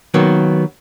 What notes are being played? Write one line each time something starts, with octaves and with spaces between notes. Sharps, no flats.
D#3 F#3 A#3 B3